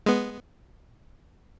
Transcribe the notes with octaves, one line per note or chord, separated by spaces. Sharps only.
G#3 B3